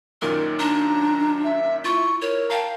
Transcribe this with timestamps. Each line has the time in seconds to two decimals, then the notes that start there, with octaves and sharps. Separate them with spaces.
0.22 F#2 A#2 D#3 A#4
0.59 D4 A#5
1.44 E5
1.84 E4 F4 C#6
2.22 A#4 C#5
2.50 F5 G5 A5 A#5